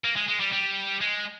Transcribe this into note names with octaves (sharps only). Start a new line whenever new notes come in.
A#3
G#3
G#3
G3
G3
G#3